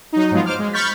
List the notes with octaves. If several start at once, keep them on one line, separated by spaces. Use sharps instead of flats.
F#3 D#4
G#2 F3 F#3 G#3 B3 F4
C5 D6 F6
G#3
B5 C#6 F6 G6 A6 B6